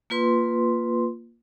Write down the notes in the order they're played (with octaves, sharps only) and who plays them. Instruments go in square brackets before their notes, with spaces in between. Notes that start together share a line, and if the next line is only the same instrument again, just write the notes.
[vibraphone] A#3 F4 B4 C6